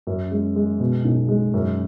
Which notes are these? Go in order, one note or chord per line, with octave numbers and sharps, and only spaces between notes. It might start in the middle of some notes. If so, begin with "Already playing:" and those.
F#2
G#3
G#3
B2
B1
G#3
F#2